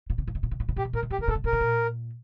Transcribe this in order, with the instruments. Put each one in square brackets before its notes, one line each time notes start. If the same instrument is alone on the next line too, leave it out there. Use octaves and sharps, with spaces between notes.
[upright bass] A#2
C3
A#2
C3
A#2
C3
A#2
C3
[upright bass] A#2 [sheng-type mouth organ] G4
[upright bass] C3
[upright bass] A#2 [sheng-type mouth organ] A#4
[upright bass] C3
[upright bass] A#2 [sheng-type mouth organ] G4
[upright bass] C3
[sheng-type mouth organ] A#4
[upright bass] A#2 [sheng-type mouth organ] A4
[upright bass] C3
[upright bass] A#2 [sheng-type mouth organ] A#4
[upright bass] C3
A#2